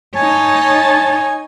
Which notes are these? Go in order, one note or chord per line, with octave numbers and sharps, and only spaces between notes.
D#4 C#5 G#5 A5